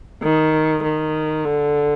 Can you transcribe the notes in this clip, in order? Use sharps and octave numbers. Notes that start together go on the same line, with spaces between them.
D#3
D#3
D3